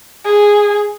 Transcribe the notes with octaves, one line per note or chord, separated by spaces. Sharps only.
G#4